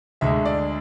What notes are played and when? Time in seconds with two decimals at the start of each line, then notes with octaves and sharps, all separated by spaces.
0.21 D2 D3 G#3 E5
0.45 D5